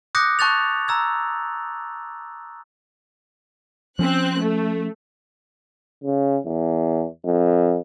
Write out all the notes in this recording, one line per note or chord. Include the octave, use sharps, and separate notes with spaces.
D6 D#6 F#6 G6 A#6 C#7
A5 C#6 F#6 G6 A6 F7
A#5 E6 G#6
F3 C4 C#4 F#6
A3
C#3
E2
F2